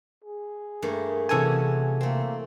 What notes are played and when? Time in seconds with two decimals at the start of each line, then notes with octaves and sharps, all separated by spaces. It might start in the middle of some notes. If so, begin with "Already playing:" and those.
0.24 G#4
0.82 G2 A3 A#3
1.29 C3 E3 F#3 C#4 A4 G#5
2.01 A3 A#3 C4